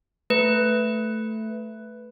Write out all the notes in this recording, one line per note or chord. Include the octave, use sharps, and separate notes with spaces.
A3 B4